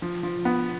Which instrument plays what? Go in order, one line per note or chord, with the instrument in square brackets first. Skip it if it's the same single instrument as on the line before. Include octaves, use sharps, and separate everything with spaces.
[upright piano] F3
F3
B3